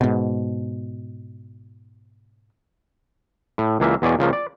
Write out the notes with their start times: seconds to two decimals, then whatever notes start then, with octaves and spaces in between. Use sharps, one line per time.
0.01 G#2 B2
3.58 A2
3.80 C#2 E3 A#3 E5
4.02 E2 B2 G#4 C#5 D5 G#5
4.19 C#2 C#3 F3 A#3
4.33 D5